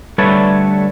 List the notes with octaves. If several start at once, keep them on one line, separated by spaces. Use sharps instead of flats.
D3 G3 A3 A4 B4 C#5